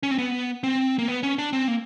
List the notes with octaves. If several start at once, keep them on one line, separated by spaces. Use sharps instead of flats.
C#4
C4
B3
C4
A#3
B3
C#4
D4
C4
A#3